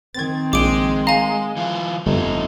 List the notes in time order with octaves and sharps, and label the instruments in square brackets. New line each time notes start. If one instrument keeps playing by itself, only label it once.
[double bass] D#3 C4 [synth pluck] G#6 A6
[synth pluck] A#1 [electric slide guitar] G#3 [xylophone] D6 D7
[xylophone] F5 G#5 [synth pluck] A#5
[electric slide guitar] E3 F4
[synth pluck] G1 [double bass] F2 [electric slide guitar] A3 D#4